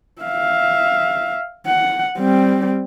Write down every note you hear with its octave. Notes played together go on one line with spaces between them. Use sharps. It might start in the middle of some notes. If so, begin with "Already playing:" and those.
E5 F5
F#5
G3 C4